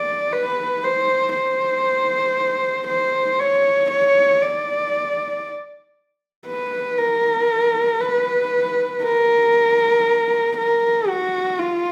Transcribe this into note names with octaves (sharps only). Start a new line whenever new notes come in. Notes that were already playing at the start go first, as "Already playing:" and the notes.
Already playing: D5
B4
C5
C5
C5
C#5
C#5
D5
B4
A#4
B4
A#4
A#4
F#4
F4